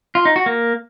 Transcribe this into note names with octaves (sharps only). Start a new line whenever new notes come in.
F4
D#4
F#4
A#3